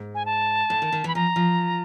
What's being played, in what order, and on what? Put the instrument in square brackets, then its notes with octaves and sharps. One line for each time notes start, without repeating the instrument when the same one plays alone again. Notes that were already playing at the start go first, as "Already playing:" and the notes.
Already playing: [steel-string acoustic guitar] G#2
[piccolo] G#5
A5
[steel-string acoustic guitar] A2
D#3
D#3
[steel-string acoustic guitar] E3 [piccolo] B5
[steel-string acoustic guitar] F3 [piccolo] A#5
[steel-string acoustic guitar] F3